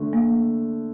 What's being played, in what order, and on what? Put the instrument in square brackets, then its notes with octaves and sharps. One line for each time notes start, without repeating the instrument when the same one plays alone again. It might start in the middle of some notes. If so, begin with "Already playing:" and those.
Already playing: [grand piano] D3 A3
[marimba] A#3